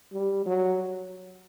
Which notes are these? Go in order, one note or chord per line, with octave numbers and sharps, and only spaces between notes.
G3
F#3